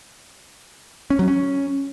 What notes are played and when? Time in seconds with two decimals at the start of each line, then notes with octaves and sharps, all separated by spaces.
1.10 C#4
1.19 F#3
1.28 C#4